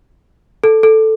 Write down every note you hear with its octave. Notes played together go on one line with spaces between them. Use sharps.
A4
A4